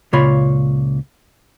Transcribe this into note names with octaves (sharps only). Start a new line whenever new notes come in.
C#2 A#2 C#3 F4 C#5 B5